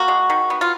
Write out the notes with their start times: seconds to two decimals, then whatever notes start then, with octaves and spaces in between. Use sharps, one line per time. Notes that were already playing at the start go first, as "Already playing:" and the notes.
Already playing: A#3 F#4
0.08 G#3
0.30 D#3
0.50 B3
0.61 F4